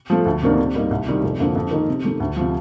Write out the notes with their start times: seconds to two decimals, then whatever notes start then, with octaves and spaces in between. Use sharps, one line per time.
0.10 F3 A3
0.26 D2
0.42 C3 D#3 A#3 D4
0.58 C3
0.75 G3 A#3 D#4
0.91 C2
1.07 C3 D#3 G3
1.23 F1
1.40 F2 D3 F3 A#3
1.56 F2
1.71 D#3 A#3 D#4 A#4
1.89 C3
2.04 D#3 A3
2.20 D2
2.37 C3 F3